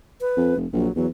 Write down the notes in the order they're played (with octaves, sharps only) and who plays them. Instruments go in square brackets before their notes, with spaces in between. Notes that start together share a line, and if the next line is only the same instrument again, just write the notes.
[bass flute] B4
[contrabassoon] F2
F1
[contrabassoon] A#1 [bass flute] F#3
[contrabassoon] E2 [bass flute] F#3